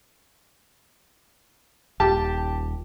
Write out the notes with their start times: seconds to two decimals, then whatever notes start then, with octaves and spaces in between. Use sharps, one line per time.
2.00 D#1 G4 A5